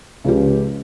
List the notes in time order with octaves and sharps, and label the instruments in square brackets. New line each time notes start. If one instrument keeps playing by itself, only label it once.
[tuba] C#2 [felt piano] C#3 F3 G4